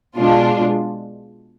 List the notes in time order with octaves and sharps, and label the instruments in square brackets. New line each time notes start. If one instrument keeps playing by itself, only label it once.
[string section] B2 G#3 D4 F4